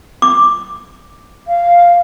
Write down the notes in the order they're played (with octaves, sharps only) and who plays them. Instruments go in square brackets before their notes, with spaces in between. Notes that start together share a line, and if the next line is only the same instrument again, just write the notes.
[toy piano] D6
[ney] F5